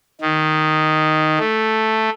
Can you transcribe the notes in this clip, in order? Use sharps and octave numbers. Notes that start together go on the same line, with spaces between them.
D#3
A3